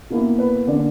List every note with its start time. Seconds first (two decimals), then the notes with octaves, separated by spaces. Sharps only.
0.10 B2 A#3 E4
0.39 B4
0.67 D3 A#3 C#4 D5